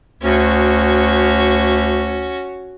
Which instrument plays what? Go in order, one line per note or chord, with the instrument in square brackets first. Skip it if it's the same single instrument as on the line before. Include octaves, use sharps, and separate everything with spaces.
[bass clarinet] D2 [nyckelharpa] C#4 F#4